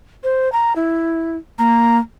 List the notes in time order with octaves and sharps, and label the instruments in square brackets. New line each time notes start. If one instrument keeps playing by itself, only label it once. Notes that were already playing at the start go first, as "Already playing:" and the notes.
[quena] C5
A#5
E4
[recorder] A#3 [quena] A#5